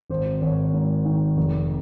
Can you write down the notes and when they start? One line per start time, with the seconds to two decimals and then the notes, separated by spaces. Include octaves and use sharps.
0.10 G#1 C5
0.42 G#1 C#5
0.73 G#2
1.05 D#3
1.37 F1